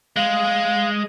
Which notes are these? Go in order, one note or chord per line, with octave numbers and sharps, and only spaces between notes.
G#3 F5